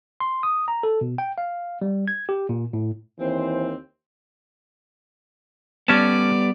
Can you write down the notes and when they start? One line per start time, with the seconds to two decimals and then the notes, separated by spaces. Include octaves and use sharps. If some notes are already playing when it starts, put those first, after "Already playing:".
0.20 C6
0.43 D#6
0.68 A#5
0.83 A4
1.01 B2
1.18 G5
1.38 F5
1.82 G3
2.08 G#6
2.29 G4
2.49 A#2
2.73 A2
3.19 D#2 E3 C4 C5
5.88 G3 B3 C#4 D5 A5